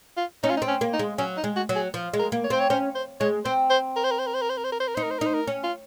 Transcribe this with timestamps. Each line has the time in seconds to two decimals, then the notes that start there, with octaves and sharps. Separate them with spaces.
0.17 F4
0.43 C#4 D#4
0.50 F4
0.57 D#4
0.62 C4
0.68 C#4
0.81 A#3
0.93 D#4
0.99 G#3
1.18 F#3 C#4
1.37 D#4
1.44 G#3
1.56 F#4
1.69 F#3
1.75 G#4
1.94 F3
2.13 G#3
2.19 A#4
2.32 A#3
2.44 C#5
2.50 C4 C5
2.60 C#5
2.70 C#4 C5
2.95 C5
3.21 G#3 C#5
3.45 C4 C5
3.70 C5
3.96 A#4
4.04 C5
4.11 A#4
4.19 C5
4.27 A#4
4.34 C5
4.41 A#4
4.50 C5
4.57 A#4
4.64 C5
4.72 A#4
4.80 C5
4.88 A#4
4.95 D#4 C5
5.03 A#4
5.11 C5
5.18 A#4
5.21 D#4 C5
5.34 A#4
5.47 C#4
5.64 F4